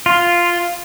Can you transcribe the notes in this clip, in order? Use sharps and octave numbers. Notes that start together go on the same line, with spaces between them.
F4